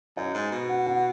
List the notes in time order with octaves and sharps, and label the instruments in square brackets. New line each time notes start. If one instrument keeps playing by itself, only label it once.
[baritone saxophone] F#2 [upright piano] D#5
[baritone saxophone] G#2
B2
[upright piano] F#5
F#5